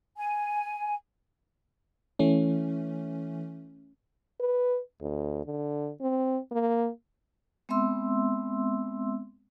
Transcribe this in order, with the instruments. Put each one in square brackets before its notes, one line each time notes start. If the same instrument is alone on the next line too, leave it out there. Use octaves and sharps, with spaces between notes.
[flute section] G#5
[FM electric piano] E3 A3 C#4
[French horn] B4
D2
D3
C4
A#3
[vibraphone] G#3 B3 C4 E5 C6 E6